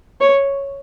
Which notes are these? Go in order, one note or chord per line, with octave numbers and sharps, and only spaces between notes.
C#5